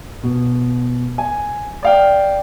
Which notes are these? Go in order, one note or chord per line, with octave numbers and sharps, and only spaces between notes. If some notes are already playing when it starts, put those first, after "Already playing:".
B2
G#5
D5 F5 G5